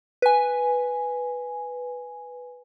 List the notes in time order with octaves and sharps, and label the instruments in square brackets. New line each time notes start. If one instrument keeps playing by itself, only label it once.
[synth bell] B4 G#5